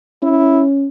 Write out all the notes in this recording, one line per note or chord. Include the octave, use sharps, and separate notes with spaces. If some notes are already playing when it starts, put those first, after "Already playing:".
C#4 E4